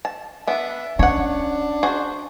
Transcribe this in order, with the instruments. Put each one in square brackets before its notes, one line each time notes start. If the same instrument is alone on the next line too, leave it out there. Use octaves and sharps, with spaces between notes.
[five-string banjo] A5
[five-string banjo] B3 D4 [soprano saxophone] E5
[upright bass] C#4 [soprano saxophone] D4 [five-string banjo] C#5 F#5
[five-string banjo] F#4 G#4 C5